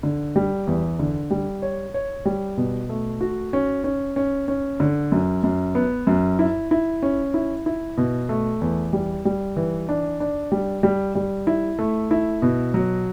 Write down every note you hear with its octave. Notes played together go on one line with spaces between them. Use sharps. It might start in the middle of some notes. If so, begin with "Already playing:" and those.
D3
G3
E2
D3
G3
C#5
C#5
G3
B2
A3
F#4
C#4
C#4
C#4
C#4
D3
F#2
F#2
B3
F#2
E4
E4
C#4
E4
E4
B2
A3
E2
G3
G3
E3
D4
D4
G3
G3
G3
E4
A3
E4
B2
F#3